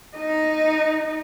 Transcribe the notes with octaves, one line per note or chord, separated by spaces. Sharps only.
D#4 D#5